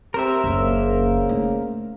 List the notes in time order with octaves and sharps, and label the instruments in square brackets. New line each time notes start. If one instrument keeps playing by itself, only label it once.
[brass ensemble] C4 G4 [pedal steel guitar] A#4 C5 E5
[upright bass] F#1 D2 [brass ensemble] C#3 A#3
[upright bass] A3 D#4